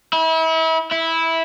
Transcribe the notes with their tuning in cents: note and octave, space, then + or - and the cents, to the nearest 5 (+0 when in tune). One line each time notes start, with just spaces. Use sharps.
E4 -35
E4 -10